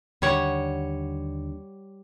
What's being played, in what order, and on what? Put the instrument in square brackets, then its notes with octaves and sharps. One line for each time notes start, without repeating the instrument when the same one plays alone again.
[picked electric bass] D#2 D3 [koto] G3 C#5 F#5